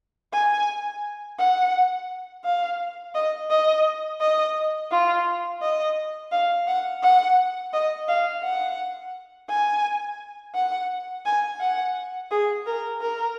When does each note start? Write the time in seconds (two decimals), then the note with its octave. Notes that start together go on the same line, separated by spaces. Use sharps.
0.33 G#5
1.39 F#5
2.45 F5
3.15 D#5
3.50 D#5
4.20 D#5
4.91 F4
5.62 D#5
6.32 F5
6.68 F#5
7.03 F#5
7.73 D#5
8.08 F5
8.44 F#5
9.49 G#5
10.55 F#5
11.26 G#5
11.61 F#5
12.31 G#4
12.66 A#4
13.01 A#4